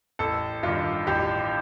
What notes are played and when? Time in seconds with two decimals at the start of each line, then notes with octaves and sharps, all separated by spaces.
0.19 A1 A4
0.63 G2 D#3 F4
1.07 A1 G4